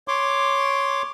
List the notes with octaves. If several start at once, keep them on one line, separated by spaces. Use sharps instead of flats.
C#5 C6 D6